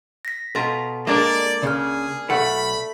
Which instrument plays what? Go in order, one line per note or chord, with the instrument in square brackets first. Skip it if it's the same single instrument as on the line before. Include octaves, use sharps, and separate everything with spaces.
[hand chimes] A#6 B6
[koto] B2 F4 A#5 [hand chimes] A4
[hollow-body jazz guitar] G#3 [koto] A#3 D4 A#4 [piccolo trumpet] D5
[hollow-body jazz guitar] C#2 C#3 [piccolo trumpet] G#4 [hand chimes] D5 F6
[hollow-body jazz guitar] B1 F#5 [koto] A3 [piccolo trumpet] B5